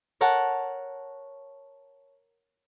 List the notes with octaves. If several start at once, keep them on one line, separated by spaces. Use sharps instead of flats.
A#4 C#5 F#5 A5